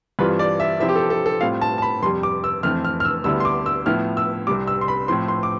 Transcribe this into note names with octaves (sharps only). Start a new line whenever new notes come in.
G2 E3 G3 C4 F4 B4
D5
E5
C3 F3 C4 E4 E5
G4
A4
A4
A4
A2 G3 C4 F4 F5
A5
A5
B5
F2 C3 G3 C6
D6
E6
F2 E3 A3 C4 F6
F6
F6
E6
D2 D3 G3 B3 E4 E6
C6
D6
E6
A2 F3 B3 E4 F6
E6
C2 C3 G3 D6
E6
C6
B5
A2 F3 C4 C6
C6
D6